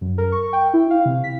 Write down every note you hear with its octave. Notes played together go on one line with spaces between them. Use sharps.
F#2
A#4
C#6
G5
E4
F5
C3
B6